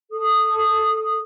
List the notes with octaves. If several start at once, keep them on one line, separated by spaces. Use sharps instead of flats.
A4 D#6